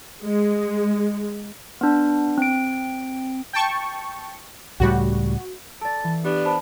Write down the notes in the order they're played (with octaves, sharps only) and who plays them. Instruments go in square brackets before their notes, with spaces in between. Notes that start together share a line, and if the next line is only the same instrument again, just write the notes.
[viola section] G#3
[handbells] B3 D4
C4 D7
[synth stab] G5 A5 C#6
[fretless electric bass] C#2 A2 G3 [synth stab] F#4
[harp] A4 D5 [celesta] A5 A6
[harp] E3
[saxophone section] B3 D4 [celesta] G4
[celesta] C5 A5 B5